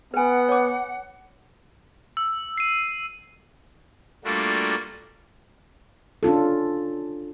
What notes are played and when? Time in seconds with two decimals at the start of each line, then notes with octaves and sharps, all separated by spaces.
0.14 B3 B4 F#5 G#5
0.49 C#5 D6
2.17 E6
2.58 C7 D#7
4.24 G3 A3 A#3 D4 F4 F#4
6.23 C#4 D4 F4 A4